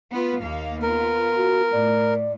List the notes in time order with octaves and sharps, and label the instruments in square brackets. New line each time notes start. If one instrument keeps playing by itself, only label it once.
[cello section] B3 F4 B4
D#2 A#3 F5
[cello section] B3 F4 [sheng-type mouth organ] A#4
[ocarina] F#4
[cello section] A2 [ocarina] D5